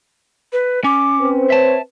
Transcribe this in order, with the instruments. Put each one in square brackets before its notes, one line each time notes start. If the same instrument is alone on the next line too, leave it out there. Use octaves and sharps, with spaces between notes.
[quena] B4
[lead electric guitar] C#4 [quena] D6
[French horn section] C4 B4 C5
[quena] C#5 [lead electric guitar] E5 A5